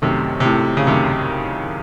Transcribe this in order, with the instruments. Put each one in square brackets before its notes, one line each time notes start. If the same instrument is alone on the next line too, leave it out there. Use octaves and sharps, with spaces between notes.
[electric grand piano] F#2 D#3 A3 [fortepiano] C3
[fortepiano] C3
A2
C#3
[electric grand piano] F#2 D#3 A3 [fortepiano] C3